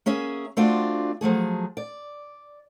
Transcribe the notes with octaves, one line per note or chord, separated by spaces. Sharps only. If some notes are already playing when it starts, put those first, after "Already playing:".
A#3 C#4 G#4 E5
A3 C4 D4 F4 F#4 D5
F3 F#3 A3 G#4
D5